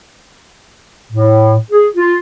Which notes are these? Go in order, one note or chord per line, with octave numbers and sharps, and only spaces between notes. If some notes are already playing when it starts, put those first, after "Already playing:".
A2
G#4
F4